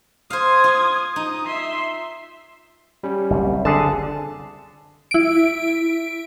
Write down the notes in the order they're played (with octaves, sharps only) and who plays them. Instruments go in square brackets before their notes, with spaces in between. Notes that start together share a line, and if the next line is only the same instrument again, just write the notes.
[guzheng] C5 F5 [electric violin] D#6 G#6
[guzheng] F4
[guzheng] D#4 [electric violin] D#6
[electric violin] E5 C6
[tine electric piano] G3 C#4
[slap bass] F#1 C2 C3
[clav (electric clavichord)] D3 G#4 [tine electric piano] A5
[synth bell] E4 D7